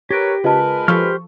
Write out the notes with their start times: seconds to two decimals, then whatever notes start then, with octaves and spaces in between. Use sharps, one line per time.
0.10 G4 A#4 B4 C#5 G#6 A#6 D7
0.44 C#3 G#3 F4 A#4 B4 D#5 A5
0.88 F3 G4 A4 C5 C#6 F6